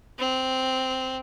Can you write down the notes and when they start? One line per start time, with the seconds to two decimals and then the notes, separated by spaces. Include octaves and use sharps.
0.18 C4